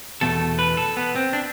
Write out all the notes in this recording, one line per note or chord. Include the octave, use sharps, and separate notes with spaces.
E2 B2 A3 A4
B4
A4
B3
C4
D4